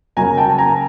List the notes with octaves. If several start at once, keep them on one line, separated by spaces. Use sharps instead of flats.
C#3 F#3 A#3 G#5 A#5
G5 A5
A5
G#5 A#5